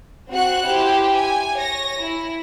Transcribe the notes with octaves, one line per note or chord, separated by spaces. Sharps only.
C4 F#4 F#5 F#6
E4 G4 C5
G#5
C#5 A#6
E4